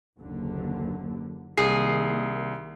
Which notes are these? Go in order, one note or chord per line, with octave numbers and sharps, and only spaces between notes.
F#1 D#2 D3
C2 D#3 A#3 G#4 C7